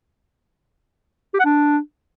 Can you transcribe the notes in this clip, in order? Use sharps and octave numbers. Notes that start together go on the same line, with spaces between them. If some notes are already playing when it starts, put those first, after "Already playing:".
G4
F#5
D4